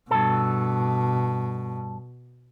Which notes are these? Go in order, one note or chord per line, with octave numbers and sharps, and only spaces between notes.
G2 B2 A4